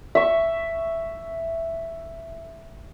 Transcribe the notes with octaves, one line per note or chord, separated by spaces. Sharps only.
E5 C#6